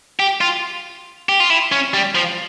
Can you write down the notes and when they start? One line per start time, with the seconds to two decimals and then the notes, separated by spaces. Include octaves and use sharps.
0.20 G4
0.41 F4
1.29 G4
1.40 F4
1.50 E4
1.72 C#4
1.94 G3
2.15 F3